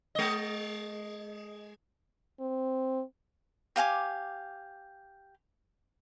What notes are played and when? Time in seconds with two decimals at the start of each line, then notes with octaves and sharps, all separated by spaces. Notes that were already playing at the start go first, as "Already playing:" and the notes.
0.15 G#3 D#5
2.40 C4
3.76 G4 F5 G#5 D6